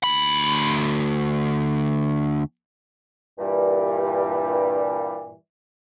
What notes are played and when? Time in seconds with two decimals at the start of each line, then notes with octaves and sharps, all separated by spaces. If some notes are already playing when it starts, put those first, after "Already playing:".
0.04 D2 B5
3.38 G2 A#2 E3 G3